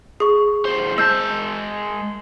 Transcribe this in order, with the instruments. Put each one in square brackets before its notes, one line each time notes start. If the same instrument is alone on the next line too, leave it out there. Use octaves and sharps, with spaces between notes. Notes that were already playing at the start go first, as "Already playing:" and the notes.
[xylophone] G#4 C#6
[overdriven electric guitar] E2 C5
[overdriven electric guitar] G#3 A5 [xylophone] E6 G6